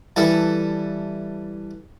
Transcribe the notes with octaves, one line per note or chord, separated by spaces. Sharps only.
E3 G3 A4